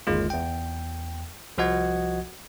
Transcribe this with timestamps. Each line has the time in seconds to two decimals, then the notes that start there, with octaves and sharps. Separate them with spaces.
0.07 G1 D#2 G#3 F4
0.30 E2 G5
1.58 C2 F3 F#4 D#5 F#5 G#6